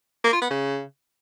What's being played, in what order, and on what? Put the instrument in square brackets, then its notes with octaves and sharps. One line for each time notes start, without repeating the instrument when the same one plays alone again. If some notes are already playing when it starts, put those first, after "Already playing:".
[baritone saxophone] A#3
F4
B3
C#3